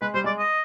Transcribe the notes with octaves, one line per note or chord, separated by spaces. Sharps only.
G#3 B4
G3 C5
G#3 D5
D#5